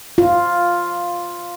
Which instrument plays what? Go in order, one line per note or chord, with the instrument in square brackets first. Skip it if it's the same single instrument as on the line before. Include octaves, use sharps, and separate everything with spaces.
[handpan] F4